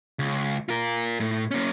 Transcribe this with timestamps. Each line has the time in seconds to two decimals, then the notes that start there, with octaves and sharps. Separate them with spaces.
0.19 C#2
0.69 F4 A#4
1.20 A2
1.51 A#3 C#4